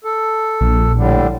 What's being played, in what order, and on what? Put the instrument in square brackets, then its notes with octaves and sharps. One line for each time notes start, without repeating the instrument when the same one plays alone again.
[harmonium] A4
[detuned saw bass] A#1
[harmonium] A2 D3 G3